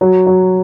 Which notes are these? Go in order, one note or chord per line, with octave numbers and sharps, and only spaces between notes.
F#3
F#3